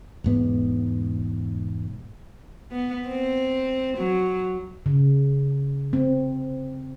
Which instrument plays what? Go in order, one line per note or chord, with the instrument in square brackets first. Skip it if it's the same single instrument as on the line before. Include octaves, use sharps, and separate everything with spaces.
[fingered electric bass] E1 G#2 B3
[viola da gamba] B3
C4
F#3
[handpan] C#3
C4